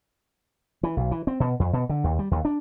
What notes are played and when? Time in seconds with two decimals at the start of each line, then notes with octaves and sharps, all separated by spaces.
0.83 E3
0.97 B1
1.11 E3
1.27 C4
1.40 B2
1.60 F2
1.73 B2
1.89 D3
2.04 D#2
2.19 G3
2.31 D#2
2.45 D4